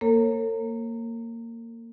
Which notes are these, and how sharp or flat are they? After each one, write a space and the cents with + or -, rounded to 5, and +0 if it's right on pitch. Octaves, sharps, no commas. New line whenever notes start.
A#3 -15 A4 +45 C#5 -35